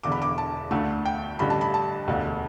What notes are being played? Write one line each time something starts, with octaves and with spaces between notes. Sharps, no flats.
E1 E2 D3 D6
B5
D6
A5
D2 D3 A3
G5
A1 G2 D3 G3 B5
A5
B5
A5
E1 D2 D3